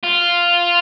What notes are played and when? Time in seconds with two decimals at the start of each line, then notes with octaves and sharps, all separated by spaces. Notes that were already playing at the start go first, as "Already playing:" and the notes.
0.03 F4